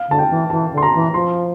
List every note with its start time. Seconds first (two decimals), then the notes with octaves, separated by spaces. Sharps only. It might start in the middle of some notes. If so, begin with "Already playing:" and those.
Already playing: F5
0.08 D3 A5
0.19 G5
0.30 E3
0.50 E3 A5
0.72 D3
0.77 C6
0.83 A#5
0.94 E3
1.14 F3 C6